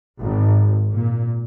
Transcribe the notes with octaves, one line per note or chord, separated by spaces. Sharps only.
G#1
A#2